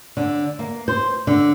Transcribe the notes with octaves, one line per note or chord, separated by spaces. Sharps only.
D3
A#3
C5
D3